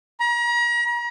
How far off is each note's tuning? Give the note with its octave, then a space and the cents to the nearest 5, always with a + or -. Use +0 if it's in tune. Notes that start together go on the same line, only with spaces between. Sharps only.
A#5 +40